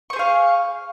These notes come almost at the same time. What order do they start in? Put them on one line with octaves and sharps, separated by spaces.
C#6 C5 G#4 F5